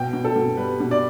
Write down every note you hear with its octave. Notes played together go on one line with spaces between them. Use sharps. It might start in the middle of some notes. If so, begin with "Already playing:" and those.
Already playing: B2 G5
B2
A4
B2
G3 B4
B2
D5